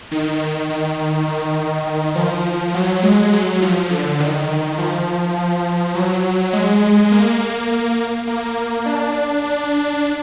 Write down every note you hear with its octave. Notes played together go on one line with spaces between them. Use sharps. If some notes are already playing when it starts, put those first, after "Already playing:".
D#3
D#3
D#3
D#3
F3
F#3
G#3
F#3
F3
D3
D#3
F3
F3
F#3
G#3
A#3
A#3
D4
D4